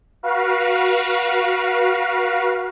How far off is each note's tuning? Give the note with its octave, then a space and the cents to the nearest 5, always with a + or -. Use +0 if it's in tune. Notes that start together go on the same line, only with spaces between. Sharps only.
F#4 +0 B4 -40 F5 +0